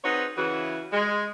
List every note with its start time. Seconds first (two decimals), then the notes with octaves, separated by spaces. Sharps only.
0.04 C4 D#4 F#4 G#4 B4 C#5
0.38 C#3 E3 F#4
0.93 G#3